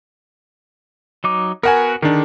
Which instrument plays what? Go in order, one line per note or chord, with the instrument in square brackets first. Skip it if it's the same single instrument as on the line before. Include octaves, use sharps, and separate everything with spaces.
[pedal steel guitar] F#3 D#4 D6
[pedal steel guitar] B3 F#4 [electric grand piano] A#4 F#5 G#5
[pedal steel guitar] D3 G#4 D5 [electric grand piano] D#3 D4